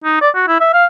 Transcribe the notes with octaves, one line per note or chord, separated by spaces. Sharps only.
D#4
D5
F#4
E4
E5
F5